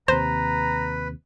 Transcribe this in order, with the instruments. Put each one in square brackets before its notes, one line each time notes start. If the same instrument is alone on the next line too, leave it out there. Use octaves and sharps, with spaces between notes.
[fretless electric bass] D#2 C3 [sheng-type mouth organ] B4 [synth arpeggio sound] C5 [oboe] A#5